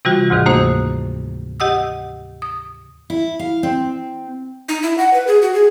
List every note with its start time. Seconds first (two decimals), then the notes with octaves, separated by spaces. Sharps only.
0.05 C3 E3 G3 F4 F#4
0.30 D2 G#2 C3 D#3 E3
0.46 A3 A#3 D#4 F#4 C5
1.60 G4 D#5 F#5 D#6 E6
2.42 D#6
3.10 E4
3.39 F5
3.63 C4
4.68 D#4
4.83 E4
4.98 F#5
5.14 B4
5.27 G#4
5.42 F#4
5.54 G#4